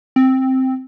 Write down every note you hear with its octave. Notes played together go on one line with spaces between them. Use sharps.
C4